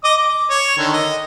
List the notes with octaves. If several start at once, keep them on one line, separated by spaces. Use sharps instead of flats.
D#5 D6 D#6
D6
C#5
D3 D#3
D#5